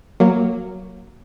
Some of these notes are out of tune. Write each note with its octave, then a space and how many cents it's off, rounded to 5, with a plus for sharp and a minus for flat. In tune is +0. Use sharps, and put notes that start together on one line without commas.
F#3 +0 A#3 +0